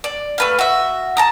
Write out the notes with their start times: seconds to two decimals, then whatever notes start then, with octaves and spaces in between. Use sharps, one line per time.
0.04 D5
0.38 A3 B4 F5
0.59 F#4 E5
1.17 A5 A#5 D#6